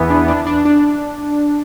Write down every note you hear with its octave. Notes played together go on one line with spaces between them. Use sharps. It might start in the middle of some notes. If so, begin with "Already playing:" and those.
Already playing: E2 E3 B3
D4
D4
D4
D4